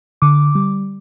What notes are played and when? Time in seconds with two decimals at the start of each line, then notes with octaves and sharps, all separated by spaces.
0.22 D3 D6
0.55 G3